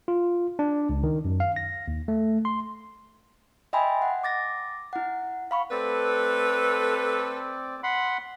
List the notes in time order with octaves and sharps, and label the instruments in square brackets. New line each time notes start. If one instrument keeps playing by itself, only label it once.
[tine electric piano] F4
D4
C#2
D#3
F#2
F5
A#6
D#2
A3
C6
[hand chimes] D#5 E5 G5 G#5 B5 C6
F#5
D6 A6 A#6
E4 F#5
F5 B5 C#6
[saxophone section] A3 A4 B4 [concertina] C4 D5
[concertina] F#5 B5 C6